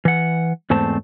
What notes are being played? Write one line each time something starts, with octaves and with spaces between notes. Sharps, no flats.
E3 F#5
E2 G#2 A3 C4 A5